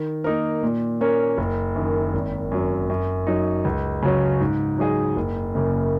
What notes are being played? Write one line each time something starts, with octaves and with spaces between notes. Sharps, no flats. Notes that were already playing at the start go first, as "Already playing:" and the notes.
Already playing: D#3
A#3 D#4 A#4
A#2
A#3 C#4 A#4 C#5
F#1
F#2 D#3
G#1
F#2 F#3
F#2
F#3 D#4
C#2
C#3 F#3 C#4
G#2
F#3 D#4 G#4 D#5
F#1
F#2 C#3 A#3